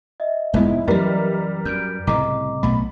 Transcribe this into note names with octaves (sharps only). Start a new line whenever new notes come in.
D#5 E5
F1 G#2 G#3 B3 E4
F#2 E3 G3 A#4 B4
F#2 G6 D7
C2 A2 C#3 D#5 A#5 D6
B1 B2 A3 B5